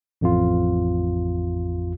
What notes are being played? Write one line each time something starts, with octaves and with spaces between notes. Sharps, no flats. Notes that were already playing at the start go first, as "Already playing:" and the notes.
A1 F2 F4